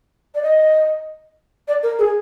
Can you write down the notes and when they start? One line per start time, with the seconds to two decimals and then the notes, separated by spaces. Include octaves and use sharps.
0.35 D5
0.42 D#5
1.68 D5
1.83 A#4
1.99 G#4